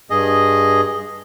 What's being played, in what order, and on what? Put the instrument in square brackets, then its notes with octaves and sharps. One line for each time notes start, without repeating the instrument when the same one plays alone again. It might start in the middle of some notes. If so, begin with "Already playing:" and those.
[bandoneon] G2 G#4 D#5